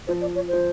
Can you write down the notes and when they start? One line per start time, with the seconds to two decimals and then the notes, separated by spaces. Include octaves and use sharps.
0.07 F3 C5
0.21 D5
0.36 C#5
0.48 F3 C5